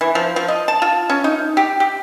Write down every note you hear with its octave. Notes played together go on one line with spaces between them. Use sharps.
E3
F3
F3
D#5
A5
F4
C#4
D#4
G4
G4